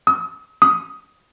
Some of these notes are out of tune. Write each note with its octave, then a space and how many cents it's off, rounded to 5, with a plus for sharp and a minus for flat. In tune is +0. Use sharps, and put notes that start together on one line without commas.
D#6 +45
D#6 +10